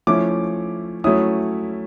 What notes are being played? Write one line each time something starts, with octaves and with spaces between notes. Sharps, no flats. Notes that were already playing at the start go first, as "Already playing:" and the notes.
F3 A3 C#4 E4 D6
F#3 A3 C#4 E4 D#6